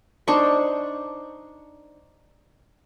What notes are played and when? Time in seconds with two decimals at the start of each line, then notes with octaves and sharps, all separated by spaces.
0.28 D4 D#4 C5 C#6